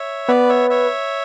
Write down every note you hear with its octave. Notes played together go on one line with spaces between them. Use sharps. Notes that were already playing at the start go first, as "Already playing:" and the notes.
Already playing: C#5 E5
B3 B4 D5
C#5 E5
C#5 E5